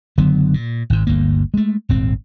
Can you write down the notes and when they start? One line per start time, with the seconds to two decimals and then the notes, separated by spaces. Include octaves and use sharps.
0.18 F#1 D3 F#3 B3
0.54 A#2
0.90 G#1 G#2
1.07 G1 D2 A#3
1.54 G#3 A3
1.89 D#1 G#1 C4